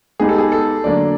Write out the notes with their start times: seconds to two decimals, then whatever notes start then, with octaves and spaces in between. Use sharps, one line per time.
0.20 G#3 B3 D#4 G4 G#4
0.29 A4
0.38 G#4
0.52 A4
0.84 D3 F#3 A#3 D4 D5